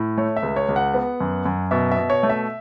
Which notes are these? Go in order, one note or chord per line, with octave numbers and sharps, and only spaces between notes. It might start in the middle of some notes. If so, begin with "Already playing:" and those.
Already playing: A2
A3 C#5
E5
C#2
C#5
C#2
F#5
B3
F#2
F#2
B2 E5
E5
B2
C#5
A3
E5